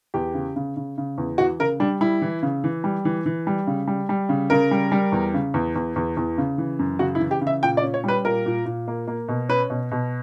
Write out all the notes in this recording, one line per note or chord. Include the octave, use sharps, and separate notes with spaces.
E2 G4
C#3
C#3
C#3
C#3
E2
E3 F#4
C#3 A#4
G3 D4
G3 E4
E3
C#3
E3
G3
E3
E3
G3
C#3
G3
G3
C#3
C#3 A#4
G3
G3
E2
C#3
E2
E2
E2
E2
C#3
E3
F#2
C#3 F#4
E4
E3
G4
C#3
E5
A#2 G5
D5
C#4
C#5
G3 B4
A#2 A#4
A#2
A#2
A#3
A#3
B2
C#4 B4
B2
B2